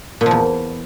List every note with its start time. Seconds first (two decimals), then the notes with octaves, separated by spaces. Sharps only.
0.21 A#2
0.26 F3
0.31 E2